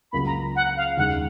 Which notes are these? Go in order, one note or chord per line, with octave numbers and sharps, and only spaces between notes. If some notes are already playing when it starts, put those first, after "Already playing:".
C#2 C#3 F#3 A#3 F4 B5
A#5
F#5
F5
D#2 C#3 G#3 D#4 F#5